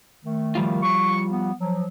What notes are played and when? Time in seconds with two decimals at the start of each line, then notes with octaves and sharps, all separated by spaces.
0.25 D#3 A3
0.55 F3 G3 F4
0.83 C#6
1.31 B3
1.59 F3 F#3